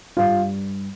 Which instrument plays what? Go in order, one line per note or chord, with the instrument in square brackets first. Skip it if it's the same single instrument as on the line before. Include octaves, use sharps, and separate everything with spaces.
[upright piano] G2 F4 F5